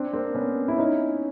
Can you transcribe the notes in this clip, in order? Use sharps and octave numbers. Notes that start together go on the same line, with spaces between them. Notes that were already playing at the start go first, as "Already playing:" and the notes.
Already playing: C4 D4
A#3 C4
B3 C#4
E4
C#4 D#4